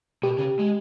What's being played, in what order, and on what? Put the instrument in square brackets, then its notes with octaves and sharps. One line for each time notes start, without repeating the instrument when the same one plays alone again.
[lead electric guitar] B2 [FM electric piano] G4
[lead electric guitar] C#3
G#3